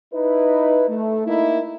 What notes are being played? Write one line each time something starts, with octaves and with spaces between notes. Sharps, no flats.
D#4 E4 B4
A3
A#3 D#4 E4